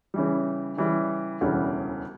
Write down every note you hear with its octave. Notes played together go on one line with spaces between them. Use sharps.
C#3 E3 G3
C#3 E3 G3
E1 D2 C#3 E3 G3